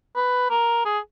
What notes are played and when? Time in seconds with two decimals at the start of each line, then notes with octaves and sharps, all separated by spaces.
0.16 B4
0.50 A#4
0.85 G#4